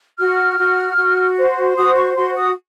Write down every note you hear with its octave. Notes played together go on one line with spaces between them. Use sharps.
F#4 F6
F#4
F#4
C5
F#4 D#6
C#6
F#4 C6
D#6